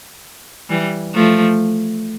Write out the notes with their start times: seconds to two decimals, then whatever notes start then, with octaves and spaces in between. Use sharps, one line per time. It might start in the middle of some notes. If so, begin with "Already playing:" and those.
0.70 E3 G3
1.14 F3 A3